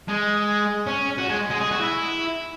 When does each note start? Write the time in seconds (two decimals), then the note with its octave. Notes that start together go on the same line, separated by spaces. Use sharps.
0.09 G#3
0.87 C#4
1.18 F#4
1.30 G#3
1.51 G#3
1.61 G#4
1.71 F#4
1.81 E4